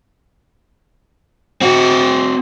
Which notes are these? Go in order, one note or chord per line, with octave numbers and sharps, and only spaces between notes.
C4 F#4